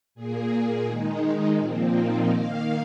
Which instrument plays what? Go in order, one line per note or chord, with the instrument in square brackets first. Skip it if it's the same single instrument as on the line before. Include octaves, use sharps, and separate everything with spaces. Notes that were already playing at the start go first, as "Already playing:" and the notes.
[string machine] A#2 A#3 G#4
D#3 G#3 D#4
A#2 F3 A#3 C4
D#4
D#3 A#3 F5